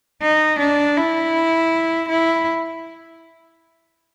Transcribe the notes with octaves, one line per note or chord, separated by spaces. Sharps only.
D#4
D4
E4
E4